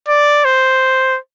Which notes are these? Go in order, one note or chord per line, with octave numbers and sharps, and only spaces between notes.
D5
C5